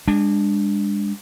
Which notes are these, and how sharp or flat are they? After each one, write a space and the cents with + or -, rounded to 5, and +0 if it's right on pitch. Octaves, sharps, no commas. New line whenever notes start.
G#3 -30 D4 +0